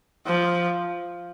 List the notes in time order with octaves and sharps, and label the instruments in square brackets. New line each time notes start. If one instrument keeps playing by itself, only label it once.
[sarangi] F3